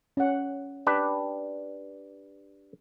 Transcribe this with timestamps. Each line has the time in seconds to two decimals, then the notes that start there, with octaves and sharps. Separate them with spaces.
0.17 C#4 F#5
0.87 D4 G4 B4